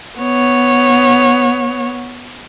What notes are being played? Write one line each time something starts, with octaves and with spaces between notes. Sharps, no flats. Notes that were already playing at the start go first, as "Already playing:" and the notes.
B3 C#5